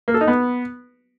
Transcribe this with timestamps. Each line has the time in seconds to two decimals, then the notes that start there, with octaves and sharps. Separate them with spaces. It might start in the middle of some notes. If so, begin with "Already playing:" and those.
0.08 A#3
0.14 A4
0.21 D#4
0.27 B3